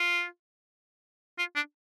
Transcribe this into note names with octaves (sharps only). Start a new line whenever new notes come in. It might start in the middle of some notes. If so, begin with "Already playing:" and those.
Already playing: F4
F4
D4